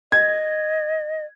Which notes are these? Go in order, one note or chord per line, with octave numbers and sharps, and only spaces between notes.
D#5 G#6